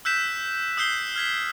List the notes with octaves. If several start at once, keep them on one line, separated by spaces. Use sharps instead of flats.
E6 F#6 G6 B6 E7
D#6 E6 F#6 G6 C7 G7
F6 G#6 B6